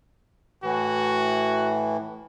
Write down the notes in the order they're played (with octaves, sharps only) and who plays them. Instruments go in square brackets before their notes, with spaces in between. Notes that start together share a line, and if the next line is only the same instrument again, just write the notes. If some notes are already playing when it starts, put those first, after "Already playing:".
[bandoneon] A2 E3 [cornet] F#4